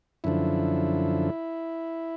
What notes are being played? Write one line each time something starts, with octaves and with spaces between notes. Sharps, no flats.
F#2 D3 F3 E4